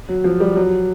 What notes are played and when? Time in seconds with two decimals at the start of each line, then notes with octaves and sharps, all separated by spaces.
0.09 F#3
0.24 F3
0.40 G3
0.56 F#3